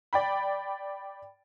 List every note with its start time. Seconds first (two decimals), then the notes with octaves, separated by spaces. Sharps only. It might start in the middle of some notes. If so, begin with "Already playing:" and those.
0.13 D5 G5 B5